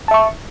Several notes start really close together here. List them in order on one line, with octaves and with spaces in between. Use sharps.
A5 E5 C#6